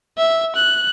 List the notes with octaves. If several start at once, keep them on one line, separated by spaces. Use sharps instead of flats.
E5
F#6